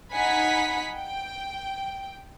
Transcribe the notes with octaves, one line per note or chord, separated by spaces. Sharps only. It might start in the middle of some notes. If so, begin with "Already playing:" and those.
D#4 F#5 G#5 B5 B6
G5